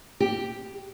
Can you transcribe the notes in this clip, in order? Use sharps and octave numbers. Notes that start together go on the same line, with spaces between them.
G4